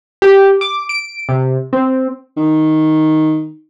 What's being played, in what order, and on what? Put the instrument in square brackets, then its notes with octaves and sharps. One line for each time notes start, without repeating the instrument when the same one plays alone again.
[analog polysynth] G4
D6
D7
C3
C4
[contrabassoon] D#3